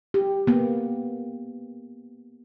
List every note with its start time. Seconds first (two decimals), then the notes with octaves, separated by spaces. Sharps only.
0.14 G4
0.47 A#3 B3